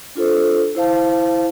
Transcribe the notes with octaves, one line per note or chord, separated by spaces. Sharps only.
D4 F4 A4 C5
E4 C5 F5 A5